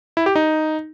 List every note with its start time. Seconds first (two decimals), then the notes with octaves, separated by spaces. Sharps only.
0.17 E4
0.26 G4
0.36 D#4